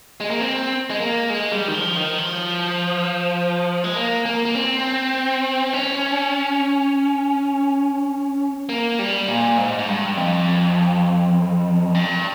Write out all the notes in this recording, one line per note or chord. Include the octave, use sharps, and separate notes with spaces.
G#3
A#3
C4
G#3
A#3
G#3
G3
D#3
F3
D#3
F3
G#3
A#3
A#3
A#3
C4
C#4
A#3
G3
A#2
G#2
G#2
G2
F2
G2